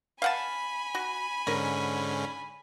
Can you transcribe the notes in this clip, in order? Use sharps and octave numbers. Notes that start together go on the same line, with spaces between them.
F5 F#5 G#5 A5 B5
F#4
G#2 D3 C#4 A#4